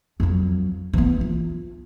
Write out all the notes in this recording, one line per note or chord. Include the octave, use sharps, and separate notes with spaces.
F2 F#3
E3 B3
F4